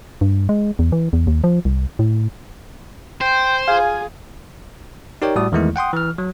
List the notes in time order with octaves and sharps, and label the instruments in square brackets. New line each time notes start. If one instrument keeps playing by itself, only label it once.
[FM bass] G2
G#3
E2
E3
E2
D#2
F3
C2
A2
[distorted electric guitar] C5 [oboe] G5
[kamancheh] F4 G#4 [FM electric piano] F5 [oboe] G#5
[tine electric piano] D#4 G4 A#4 C#5 D5 G5
A2 G3 F#4 D5 D#6
E2 D#3 E3 G#3 A3 E4
F#5 G5 C6 D#6
E3 F6
F#3